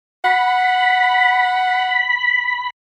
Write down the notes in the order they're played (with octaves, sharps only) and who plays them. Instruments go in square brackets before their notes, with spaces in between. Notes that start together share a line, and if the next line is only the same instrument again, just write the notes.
[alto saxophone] F#5 [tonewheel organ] B5